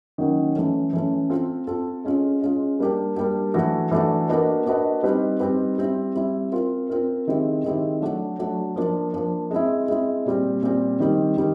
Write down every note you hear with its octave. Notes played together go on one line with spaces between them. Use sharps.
D#3 F#3 A#3 C#4
E3 A3 C#4
E3 A3 C#4
C4 F4 A4
C4 F4 A4
G#3 C#4 F4
G#3 C#4 F4
G3 A#3 D4 G4
G3 A#3 D4 G4
E3 A3 D4 F#4 A4
E3 A3 D4 F#4 A4
A#3 D4 F#4 B4 D#5
A#3 D4 F#4 B4 D#5
G3 C4 D#4 G4 B4
G3 C4 D#4 G4 B4
G3 C4 E4
G3 C4 E4
C4 F4 A#4
C4 F4 A#4
D#3 G#3 C4 E4 G4
D#3 G#3 C4 E4 G4
F#3 A3 D4 F#4
F#3 A3 D4 F#4
F3 A#3 D4
F3 A#3 D4
G#3 C4 E4
G#3 C4 E4
A#2 G3 C4
A#2 G3 C4
D#3 G3 C4
D#3 G3